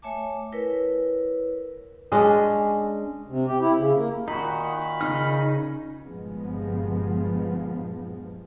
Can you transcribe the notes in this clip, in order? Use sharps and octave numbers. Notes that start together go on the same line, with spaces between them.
A3 C#5 E5 G#5 A5 D6
E4 A#4 B4 C#5
G#3 C#4 D4 D#5
C3
G4
E4
C#3
A#3
A#2 D#3 D#4 F#4 B5
C#3 D4 D#4 F6
G1 G2 A#2 F3 G#3 B3